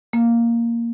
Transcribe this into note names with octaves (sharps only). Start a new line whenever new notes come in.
A#3